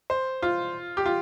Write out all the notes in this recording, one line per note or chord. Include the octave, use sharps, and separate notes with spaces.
C5
F4
G4
F4